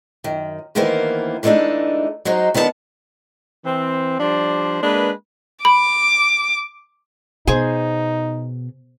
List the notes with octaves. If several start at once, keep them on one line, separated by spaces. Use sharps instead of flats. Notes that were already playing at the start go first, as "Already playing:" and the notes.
F#2 D#3
D2 D#3 E3 A#3 B3 C5
E3 G#3 A3 C4 D4 D#4
F#3 G#3 D#4 C5
D#3 B3 D4 E4 F#5 A5
E3 C4
F3 G3 D4 C5 D5
G#3 A#3 D4 B4
B5 D6
B2 D#4 G#4 C5 G#5